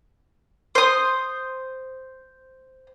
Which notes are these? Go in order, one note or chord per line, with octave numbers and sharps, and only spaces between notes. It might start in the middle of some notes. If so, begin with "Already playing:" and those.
C5 D#6